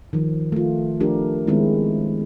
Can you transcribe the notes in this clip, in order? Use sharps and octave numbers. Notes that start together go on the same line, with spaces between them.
D#3 F3
A3 F4
F3 A3 D4 G4 A#4
D#3 G#3 B3 C4 E4